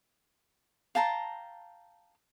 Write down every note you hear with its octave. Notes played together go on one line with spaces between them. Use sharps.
F5 G5 A5 A#5